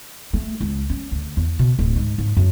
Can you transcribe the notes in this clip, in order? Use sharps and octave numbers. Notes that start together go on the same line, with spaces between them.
A3
C#2
C#4
D2
E2
B2
D1
G#2
G#2
F#2